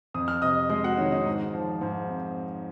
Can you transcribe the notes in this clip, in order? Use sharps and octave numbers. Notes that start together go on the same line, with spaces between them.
F2 D#6
F6
C3 D#5 D#6
G#3 D#5 D#6
F#4 F#5
D#3 C#5
D#4 D#5
G#2
F3
G#2
C4